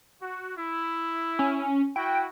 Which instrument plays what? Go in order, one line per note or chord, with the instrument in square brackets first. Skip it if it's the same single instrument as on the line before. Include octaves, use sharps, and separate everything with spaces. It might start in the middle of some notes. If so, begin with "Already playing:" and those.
[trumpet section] F#4
E4
[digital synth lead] C#4
[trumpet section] E4 F#4 [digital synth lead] G5